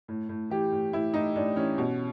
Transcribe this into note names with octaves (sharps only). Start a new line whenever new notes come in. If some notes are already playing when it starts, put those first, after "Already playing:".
A2
A2
E3 G4
A2
A2 E4
A2 D#4
A2 D4
E3 C#4
B2